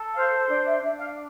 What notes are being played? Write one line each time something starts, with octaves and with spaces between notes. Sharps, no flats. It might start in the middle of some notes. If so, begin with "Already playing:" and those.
Already playing: A4
C5 F5
D4 D5
E5
D4 E5
F5